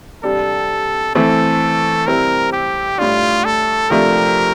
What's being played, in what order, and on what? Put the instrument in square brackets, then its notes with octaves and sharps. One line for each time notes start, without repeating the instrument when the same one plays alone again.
[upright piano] C3 G3 D4 [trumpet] A4
[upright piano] E3 A3 C4 [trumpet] A4
[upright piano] C3 G3 C4 E4 [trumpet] A#4
[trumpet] G4
[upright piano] A2 G3 D4 [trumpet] F4
[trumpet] A4
[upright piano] C3 F3 A3 D4 [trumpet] A#4